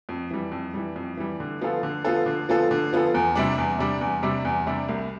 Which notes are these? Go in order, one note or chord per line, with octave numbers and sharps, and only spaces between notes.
F2
E3 G3
F2
E3 G3
F2
E3 G3
D3
F3 B3 F4 A4
D3
F3 B3 F4 A4
D3
F3 B3 F4 A4
D3
F3 B3 F4 A4
E2
C3 G3 D4
E2
C3 G3 D4
E2
C3 G3 D4
E2
C3 G3 D4
C2